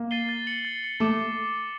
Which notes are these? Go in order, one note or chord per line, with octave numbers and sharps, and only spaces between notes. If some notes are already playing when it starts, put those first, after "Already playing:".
Already playing: A#3
A6 C7 D#7 G7
A6
C#7 F#7
A6
C#7 F#7
A3 D6